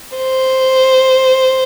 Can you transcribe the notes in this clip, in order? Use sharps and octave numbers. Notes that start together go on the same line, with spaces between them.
C5